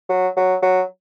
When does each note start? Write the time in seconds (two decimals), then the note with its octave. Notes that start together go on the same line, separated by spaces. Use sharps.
0.09 F#3
0.36 F#3
0.63 F#3